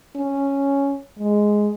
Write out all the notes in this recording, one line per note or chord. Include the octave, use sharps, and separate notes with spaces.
C#4
G#3